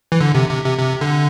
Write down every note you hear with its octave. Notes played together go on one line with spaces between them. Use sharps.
E3
D3
C3
C3
C3
C3
D3